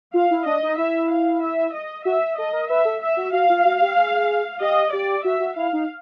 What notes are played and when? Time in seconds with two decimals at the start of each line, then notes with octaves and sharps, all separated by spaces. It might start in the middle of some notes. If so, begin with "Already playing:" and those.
0.14 F4 F5
0.31 E4
0.46 D4 D#5
0.63 D#4
0.78 E4 E5
1.10 F5
1.42 E5
1.74 D#5
2.05 F#4 E5
2.37 A4 D#5
2.53 A#4
2.69 B4 E5
2.85 A4
3.01 E5
3.17 F#4
3.33 F#4 F5
3.50 F4
3.65 F#4
3.82 G4
3.97 G#4
4.60 G4 D#5
4.93 G4 D5
5.24 F#4 E5
5.40 F#4
5.56 E4 F5
5.73 D#4